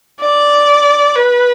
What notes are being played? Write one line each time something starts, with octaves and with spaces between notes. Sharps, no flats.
D5
B4